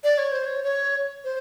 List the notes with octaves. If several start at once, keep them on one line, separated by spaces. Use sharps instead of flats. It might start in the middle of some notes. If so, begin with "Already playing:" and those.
D5
C#5
C5
C#5
C#5
C5